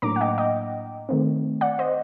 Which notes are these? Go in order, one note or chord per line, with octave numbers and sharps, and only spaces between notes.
A2 F#3 A#3 D4 A#5 D6
F#5
D#5 G5
D#5 G5
D#3 A3 C4
D5 F#5
C5 D#5